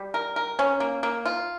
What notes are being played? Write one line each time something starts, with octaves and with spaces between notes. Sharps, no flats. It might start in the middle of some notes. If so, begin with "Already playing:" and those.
Already playing: G3
A#4
A#4
C#4
A#3
A#3
F4